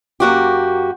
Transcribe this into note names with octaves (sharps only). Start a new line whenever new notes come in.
F#2 A#3 F#4 G4